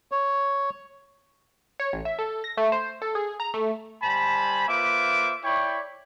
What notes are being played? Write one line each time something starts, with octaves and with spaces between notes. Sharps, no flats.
C#5
C#5
A1
E5
A4
A#6
A3
C5
A4
G#4
A#5
A3
G3 C5 G#5 A5 B5
A#3 F4 B4 C5 E5 D6
E4 C#5 D5 G5 B5 C#6